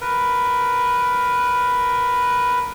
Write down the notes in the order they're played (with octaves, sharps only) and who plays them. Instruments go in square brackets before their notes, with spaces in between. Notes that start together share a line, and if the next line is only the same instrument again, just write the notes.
[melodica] A#4 B4